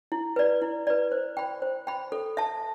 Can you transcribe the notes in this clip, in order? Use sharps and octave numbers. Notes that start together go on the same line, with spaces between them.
E4
B4 D5
E4
B4 D5
C5
G5 B5
C5
G5 B5
A4
E5 A5